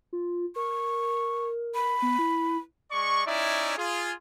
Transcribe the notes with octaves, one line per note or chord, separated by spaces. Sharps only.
F4
A#4 C#6
B5
B3
E4
G#3 D5 C#6
C#4 D#4 E4 D5 E5
F4 G#4